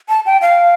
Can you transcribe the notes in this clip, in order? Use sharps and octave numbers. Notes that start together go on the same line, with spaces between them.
A5
G5
F5